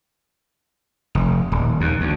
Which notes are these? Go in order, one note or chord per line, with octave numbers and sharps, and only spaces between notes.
F1
D#1
D#2
D2